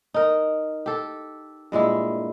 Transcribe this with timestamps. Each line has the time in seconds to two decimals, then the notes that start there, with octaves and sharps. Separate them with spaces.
0.14 D#4 A#4
0.86 G4 A4
1.72 G2 A#2 G#3 E4